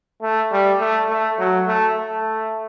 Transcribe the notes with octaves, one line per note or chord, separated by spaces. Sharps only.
A3
G3
A3
A3
F#3
A3
A3